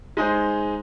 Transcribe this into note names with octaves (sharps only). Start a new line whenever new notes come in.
G#3 D#4 G#4 C5